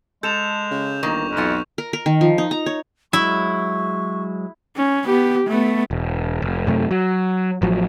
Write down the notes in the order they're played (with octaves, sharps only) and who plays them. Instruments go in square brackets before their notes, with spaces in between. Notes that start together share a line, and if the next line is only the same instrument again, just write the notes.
[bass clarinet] G#3 [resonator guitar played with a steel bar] A4 [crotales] G6 E7 F7
[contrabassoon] C#3
[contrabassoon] G1 [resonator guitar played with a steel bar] D#3 A#3 [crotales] C#6
[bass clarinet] F2
[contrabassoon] B1 [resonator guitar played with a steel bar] E3 F4 F#5
[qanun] A#4
A#4
D#3
F3
D#4
A#5
C#5
[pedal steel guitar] F#3 G#3 [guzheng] E4 [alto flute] C#6
[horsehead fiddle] C#4
B3 G4
A3 B3
[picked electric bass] E1
F1
F#2 C3 A3
F#3
A1 F3 F#3